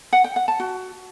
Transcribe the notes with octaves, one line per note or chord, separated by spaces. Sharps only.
F#5
G5
F#5
A5
F#4